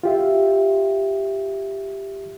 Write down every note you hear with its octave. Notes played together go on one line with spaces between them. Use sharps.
F4 G4 E5